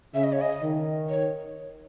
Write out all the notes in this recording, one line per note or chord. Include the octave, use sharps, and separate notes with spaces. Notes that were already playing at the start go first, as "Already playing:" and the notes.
C#3 E5
D#5
C#5
D#5
D#3
C#5